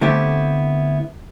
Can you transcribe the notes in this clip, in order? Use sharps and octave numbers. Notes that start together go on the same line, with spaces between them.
D3 A3 B3 C4 E4 G4